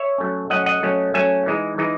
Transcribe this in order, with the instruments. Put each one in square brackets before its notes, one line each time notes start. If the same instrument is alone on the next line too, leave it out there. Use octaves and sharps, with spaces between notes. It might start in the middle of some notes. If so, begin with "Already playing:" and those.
Already playing: [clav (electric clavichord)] C#5 E5
F#3 A3 C#4
F#3 A3 C#4 D#5 F#5
D#5 F#5
F#3 A3 C#4
F#3 A3 C#4 E5 G#5
E3 G#3 D#4
E3 G#3 D#4